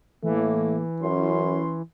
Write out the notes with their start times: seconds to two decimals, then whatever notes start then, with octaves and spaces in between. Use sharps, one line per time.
0.23 A2 E3 A3 A#3
1.02 F#2 C#4 E4 C6